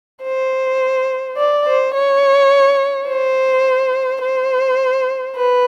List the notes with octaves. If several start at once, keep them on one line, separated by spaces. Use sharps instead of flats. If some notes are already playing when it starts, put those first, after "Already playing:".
C5
D5
C5
C#5
C5
C5
B4